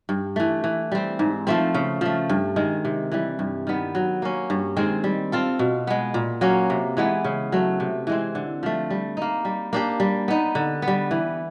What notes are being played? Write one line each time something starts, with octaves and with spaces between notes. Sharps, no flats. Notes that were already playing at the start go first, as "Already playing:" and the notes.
G2
E3 A3
E3
G3 C4
G#2
F3 A3 C4
C#3
F3 A3
G2
D#3 G#3
C3
E3 G3
G2
D#3 G3 B3
F#3
A#3 C#4
G2
D#3 G#3 C4
G3
C4 F4 A4
B2
G#3 B3
A#2
F#3 A#3 C#4
C3
E3 G#3 B3
C#3
F#3 A3
C3
E3 G#3 C4
D3
F3 A3
G3
A#3 D#4
G3
A#3 D4 G4
G3
B3 D#4
D3
B3
G3
E3